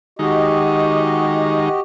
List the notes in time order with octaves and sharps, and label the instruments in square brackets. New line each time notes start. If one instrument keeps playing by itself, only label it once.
[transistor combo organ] D#3 G#3 D#4 [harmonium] F#4 G4 D#5